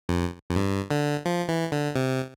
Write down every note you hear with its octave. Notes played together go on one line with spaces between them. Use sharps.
F2
F2
G2
D3
F3
E3
D3
C3